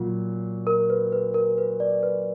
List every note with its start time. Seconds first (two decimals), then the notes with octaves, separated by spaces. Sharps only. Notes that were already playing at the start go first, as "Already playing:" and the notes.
Already playing: A#2 F#3 F4
0.67 A#4
0.90 B4
1.12 B4
1.34 A#4
1.58 B4
1.80 D5
2.03 B4